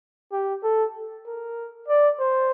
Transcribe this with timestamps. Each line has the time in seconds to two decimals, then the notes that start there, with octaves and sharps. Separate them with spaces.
0.32 G4
0.63 A4
1.26 A#4
1.88 D5
2.20 C5